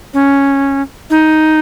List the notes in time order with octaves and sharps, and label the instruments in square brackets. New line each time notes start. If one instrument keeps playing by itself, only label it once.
[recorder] C#4
D#4